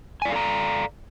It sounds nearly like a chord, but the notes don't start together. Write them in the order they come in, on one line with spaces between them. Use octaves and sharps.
G#5 D5 F5 A4 A#5